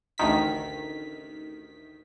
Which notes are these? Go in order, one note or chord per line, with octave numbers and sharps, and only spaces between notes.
A1 D2 D#3 B6